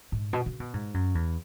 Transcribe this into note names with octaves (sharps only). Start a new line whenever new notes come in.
G#2
B2
C#3
B2
G#2
F#2
E2